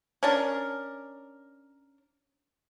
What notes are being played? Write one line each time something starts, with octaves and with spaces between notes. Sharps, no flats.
C#4 D4 A#4